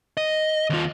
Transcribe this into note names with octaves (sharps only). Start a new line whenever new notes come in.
D#5
D#2 F4